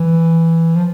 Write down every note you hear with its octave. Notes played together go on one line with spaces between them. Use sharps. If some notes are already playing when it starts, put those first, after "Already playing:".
Already playing: E3
F3